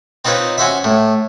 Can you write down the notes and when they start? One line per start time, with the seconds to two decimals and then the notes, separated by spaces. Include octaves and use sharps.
0.25 C4 D#4 F4 B4 C#5
0.58 C#4 F#4 C5 E5
0.84 A2